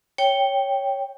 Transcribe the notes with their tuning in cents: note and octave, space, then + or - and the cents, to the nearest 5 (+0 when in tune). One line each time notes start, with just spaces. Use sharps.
C#5 +0 G5 +0